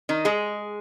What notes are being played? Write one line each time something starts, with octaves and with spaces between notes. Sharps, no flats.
D#3 D#4
G#3 G#4